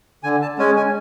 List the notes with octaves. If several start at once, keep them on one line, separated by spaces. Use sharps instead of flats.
D3 G#5
A5
G#3 C#4 G#5
G#5